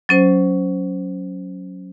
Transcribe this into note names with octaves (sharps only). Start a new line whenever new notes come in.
F#3 C#4 C5